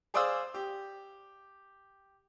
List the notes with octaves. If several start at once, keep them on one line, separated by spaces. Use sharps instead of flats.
G#4 C5 D5 F5 D#6 E6
G4